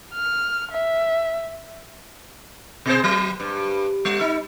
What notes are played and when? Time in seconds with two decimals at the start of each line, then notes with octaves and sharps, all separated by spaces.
0.13 F6
0.71 E5
2.86 B2 G#4 C5
3.04 F#3
3.40 G2
4.05 G3
4.21 D#4